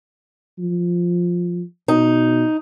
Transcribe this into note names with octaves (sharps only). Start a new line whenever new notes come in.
F3
B2 D#4